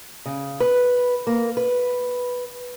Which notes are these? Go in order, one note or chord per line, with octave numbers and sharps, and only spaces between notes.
C#3
B4
A#3
B4